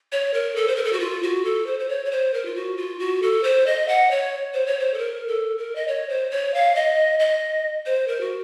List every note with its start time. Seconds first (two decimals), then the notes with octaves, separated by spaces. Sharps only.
0.12 C#5
0.34 A#4
0.56 A4
0.68 C5
0.76 A#4
0.85 A4
0.93 F#4
1.00 F4
1.23 F#4
1.45 A4
1.66 C5
1.79 C5
1.89 C#5
2.05 C#5
2.11 C5
2.34 A#4
2.45 F4
2.56 F#4
2.77 F4
2.99 F#4
3.22 A4
3.43 C5
3.67 D#5
3.88 F#5
4.11 C#5
4.54 C5
4.66 C#5
4.80 C5
4.94 A4
4.98 A#4
5.28 A4
5.58 A#4
5.76 D#5
5.88 C#5
6.09 C5
6.31 C#5
6.54 F5
6.75 D#5
7.20 D#5
7.86 C5
8.08 A#4
8.21 F#4